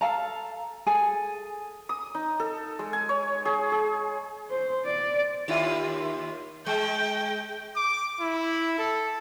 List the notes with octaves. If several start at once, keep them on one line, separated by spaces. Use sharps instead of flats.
A4 F5 A5 A#5
G#4 A4 G#5
D#6
D#4
A4
G#3
G#5
C#5
G#4
G#4
C5
D5
D#2 E4 F4
G#3 G5
D6
E4
A4